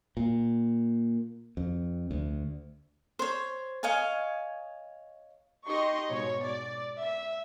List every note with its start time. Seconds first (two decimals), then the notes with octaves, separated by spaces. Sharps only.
0.17 A#2
1.57 F2
2.11 D2
3.19 C5 C#5
3.83 C#5 D#5 F5 G#5
5.67 D#4 G4 D#5 C6 C#6
6.10 G#2 B2 C#5
6.45 D5
6.99 E5